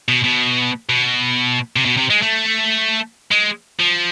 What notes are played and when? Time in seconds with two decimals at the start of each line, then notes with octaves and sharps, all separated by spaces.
0.08 B2
0.24 B2
0.90 B2
1.76 C3
1.86 B2
1.97 C3
2.10 G#3
2.22 A3
3.32 G#3
3.80 F3